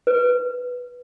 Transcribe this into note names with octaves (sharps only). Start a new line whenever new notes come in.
B4